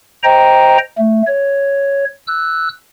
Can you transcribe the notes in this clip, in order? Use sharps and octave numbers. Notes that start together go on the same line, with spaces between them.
C5 D#5 G5 A#5
A3
C#5
E6 F#6